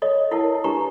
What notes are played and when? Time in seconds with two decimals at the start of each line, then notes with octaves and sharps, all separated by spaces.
0.02 A4 C#5 D#5
0.31 E4 A4 A#4 C#5 F#5 A5
0.64 D4 G4 B4 A#5 C#6